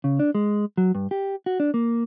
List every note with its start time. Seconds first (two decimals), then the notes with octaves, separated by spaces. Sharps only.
0.04 C#3
0.19 D4
0.35 G#3
0.78 F#3
0.95 G2
1.11 G4
1.46 F#4
1.60 D4
1.74 A#3